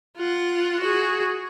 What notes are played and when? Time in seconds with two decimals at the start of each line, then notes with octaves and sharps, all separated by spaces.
0.17 F4 F#5
0.80 F#4 G#4